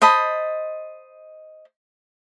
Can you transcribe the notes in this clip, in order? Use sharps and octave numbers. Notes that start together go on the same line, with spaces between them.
C5 D#5 A5 B5